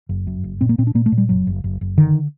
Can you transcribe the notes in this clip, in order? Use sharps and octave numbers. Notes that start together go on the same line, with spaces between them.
F#1
F#2
F#1
A#2 C4
A#3
A#2 C4
D4
A#2 A#3
A3
A#2
G3
F#1 F#3
F#1
F#1
F#1
D3 D#3